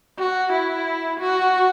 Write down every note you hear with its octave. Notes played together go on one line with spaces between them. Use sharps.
F#4
E4
F#4